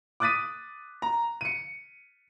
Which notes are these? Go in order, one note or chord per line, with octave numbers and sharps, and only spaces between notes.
D6 D#6 F#6 A6 B6 D#7
A#5
C#7 D#7